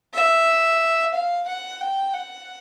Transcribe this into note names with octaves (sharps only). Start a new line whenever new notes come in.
E5
F5
F#5
G5
F#5